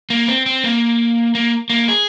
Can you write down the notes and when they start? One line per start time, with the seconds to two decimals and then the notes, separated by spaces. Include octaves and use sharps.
0.10 A#3
0.28 C4
0.46 C4
0.64 A#3
1.35 A#3
1.70 A#3
1.88 G#4